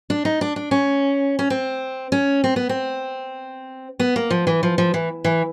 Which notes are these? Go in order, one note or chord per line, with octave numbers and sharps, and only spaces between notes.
D4
D#4
D4
D4
C#4
C#4
C4
C#4
C4
B3
C4
B3
A#3
F3
E3
F3
F3
E3
E3